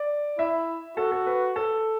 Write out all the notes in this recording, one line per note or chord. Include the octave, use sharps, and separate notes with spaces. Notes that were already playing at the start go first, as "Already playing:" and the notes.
Already playing: D5
E4 E5
F#4 A4
A4
B4
A4